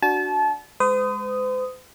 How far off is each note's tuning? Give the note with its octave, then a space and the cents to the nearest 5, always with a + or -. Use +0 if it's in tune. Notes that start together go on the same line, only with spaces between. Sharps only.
D4 +0 F#4 +0 A5 -30
G#3 +0 C5 -45 D#6 +0